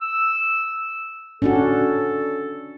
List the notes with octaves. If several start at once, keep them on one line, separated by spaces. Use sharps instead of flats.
E6
C#4 D4 F#4 A4